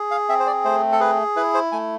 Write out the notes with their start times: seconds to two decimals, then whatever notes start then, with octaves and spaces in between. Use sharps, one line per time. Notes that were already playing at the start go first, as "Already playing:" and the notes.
Already playing: G#4
0.11 F5
0.29 C4 E5
0.40 C5
0.47 D5
0.64 A3 C5
0.92 A4
1.00 G#4 B4
1.36 E4 B4
1.54 C5
1.72 A3 G#5